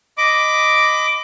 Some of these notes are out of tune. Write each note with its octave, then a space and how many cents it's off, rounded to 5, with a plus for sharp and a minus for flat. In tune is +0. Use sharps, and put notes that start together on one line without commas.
D#5 +0 B5 +25 D6 +0